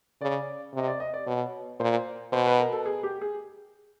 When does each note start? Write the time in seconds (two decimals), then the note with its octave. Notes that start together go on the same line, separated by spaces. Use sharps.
0.21 C#3 D5
0.74 C3
0.79 D#5
0.87 D5
1.00 D#5
1.14 D5
1.27 B2 C#5
1.80 A#2 C5
2.32 B2 C5
2.46 B4
2.59 A#4
2.72 A4
2.86 G#4
3.03 G4
3.21 G#4